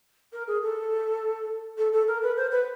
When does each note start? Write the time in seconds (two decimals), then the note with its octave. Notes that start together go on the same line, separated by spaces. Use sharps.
0.32 A#4
0.47 G#4
0.62 A4
1.78 A4
1.92 A4
2.07 A#4
2.22 B4
2.36 C5
2.51 B4